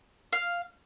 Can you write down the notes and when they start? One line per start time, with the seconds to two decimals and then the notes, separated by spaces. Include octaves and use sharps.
0.33 F5